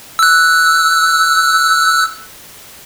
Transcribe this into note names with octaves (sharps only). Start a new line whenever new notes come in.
E6 F#6